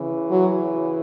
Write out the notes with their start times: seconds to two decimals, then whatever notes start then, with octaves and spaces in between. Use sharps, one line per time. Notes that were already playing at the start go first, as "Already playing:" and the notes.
Already playing: C#3 E3
0.31 F#3